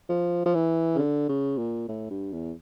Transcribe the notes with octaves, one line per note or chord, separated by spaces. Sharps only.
F3
F3
E3
C#3
D3
C#3
A#2
A2
G2
E2